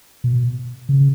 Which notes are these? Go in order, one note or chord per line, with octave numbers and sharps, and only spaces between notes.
B2
C#3